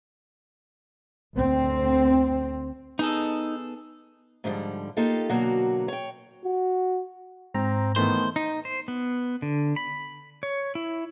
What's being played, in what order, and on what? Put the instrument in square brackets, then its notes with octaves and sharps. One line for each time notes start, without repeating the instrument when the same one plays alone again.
[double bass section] D2 C4
[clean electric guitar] B3 G#4 A4 [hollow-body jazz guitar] D#4
[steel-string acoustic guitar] G#2 D3 F3 G3
A#3 D#4 F4 G4 A4
B2 D3 F#3 A#3 F#4
C#5 G5
[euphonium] F#4
[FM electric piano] G#2 A#5 [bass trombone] C4
[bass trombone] D#3 [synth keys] E3 A3 B3 [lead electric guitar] C5
[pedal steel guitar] D#4
C5
B3
D3
B5
C#5
E4